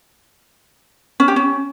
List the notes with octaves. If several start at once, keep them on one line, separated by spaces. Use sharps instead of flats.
C#4
G4
C#4